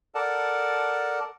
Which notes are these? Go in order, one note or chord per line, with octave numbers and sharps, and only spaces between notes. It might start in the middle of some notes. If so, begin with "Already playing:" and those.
A4 A#4 D5 F#5 A5